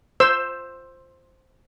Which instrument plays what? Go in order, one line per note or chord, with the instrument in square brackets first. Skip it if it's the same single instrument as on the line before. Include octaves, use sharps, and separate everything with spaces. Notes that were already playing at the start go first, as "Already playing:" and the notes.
[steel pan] C5 E6